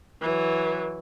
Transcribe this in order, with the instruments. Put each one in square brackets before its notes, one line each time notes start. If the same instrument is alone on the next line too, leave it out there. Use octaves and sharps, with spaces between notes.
[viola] E3 F#3